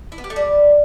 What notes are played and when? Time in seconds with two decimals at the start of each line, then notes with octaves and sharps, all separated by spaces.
0.12 E4
0.18 B3
0.24 G4
0.30 A3
0.36 G3